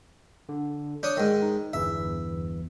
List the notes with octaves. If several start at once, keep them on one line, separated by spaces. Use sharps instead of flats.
D3
D4 C#5 D#6 G6
G#2 D#3
D#4
G1 E2 E3 E5